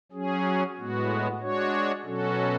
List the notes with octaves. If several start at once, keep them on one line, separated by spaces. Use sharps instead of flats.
F#3 C#4 G#4
A2 G#3 B3 F#4
G#3 D4 F#4 C#5
B2 F#3 C#4 F#4 A4